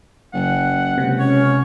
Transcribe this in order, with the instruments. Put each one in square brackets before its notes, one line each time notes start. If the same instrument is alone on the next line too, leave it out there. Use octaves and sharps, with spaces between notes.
[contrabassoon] F#1 [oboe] F#5
[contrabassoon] C#2 [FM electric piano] C3
[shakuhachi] C#4 [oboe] C#5